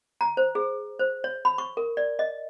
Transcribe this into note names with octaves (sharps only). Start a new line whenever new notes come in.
A#5
C5
G#4
C5
C#5
B5
C#6
A#4
D5
D#5